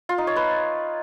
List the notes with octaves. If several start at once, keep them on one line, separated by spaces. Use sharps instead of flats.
F4
D#4
C#5
B4